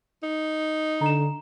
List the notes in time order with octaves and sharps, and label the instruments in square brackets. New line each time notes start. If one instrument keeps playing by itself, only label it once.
[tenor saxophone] D#4
[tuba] D3 [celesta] A#5 E7